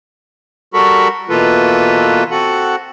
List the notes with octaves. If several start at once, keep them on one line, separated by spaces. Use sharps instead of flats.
G3 F#4 A4 A#4 B5 C#6
B2 E3 A#3 F4 A4 B4
C4 F#4 A4 F#5